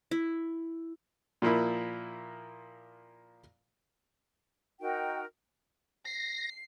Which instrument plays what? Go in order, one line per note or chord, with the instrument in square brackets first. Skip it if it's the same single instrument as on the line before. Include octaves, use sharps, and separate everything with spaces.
[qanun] E4
[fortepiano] A#2 F3 A#3 E4
[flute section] D#4 F#4 A#4 G5
[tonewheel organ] A#6 [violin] C7